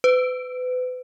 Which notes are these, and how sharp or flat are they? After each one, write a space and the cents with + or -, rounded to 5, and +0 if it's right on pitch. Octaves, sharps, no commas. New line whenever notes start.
B4 +35